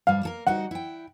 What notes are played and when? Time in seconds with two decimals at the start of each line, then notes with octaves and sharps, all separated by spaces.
0.07 G2 G3 F5
0.23 A#3 A4 A#4
0.47 G3 D#4 F#4 F#5
0.71 E4 G5